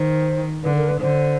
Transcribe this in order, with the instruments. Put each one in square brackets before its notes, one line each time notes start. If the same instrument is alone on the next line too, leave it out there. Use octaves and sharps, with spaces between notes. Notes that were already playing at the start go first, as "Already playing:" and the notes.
Already playing: [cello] D#3 [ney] C5
[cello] D3 [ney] B4
[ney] A#4
B4
[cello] D3 [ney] C5